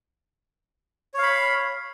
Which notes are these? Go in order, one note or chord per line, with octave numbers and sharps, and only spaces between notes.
C#5 F5 B5